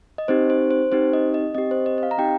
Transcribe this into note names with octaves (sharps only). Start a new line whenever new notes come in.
D#5
C4 D#4 G4 C5
C5
C5
C4 D#4 G4 C5
D#5
D#5
C4 G4 D#5
C5
D#5
D#5
F5
A#5
C4 D#4 G4 G5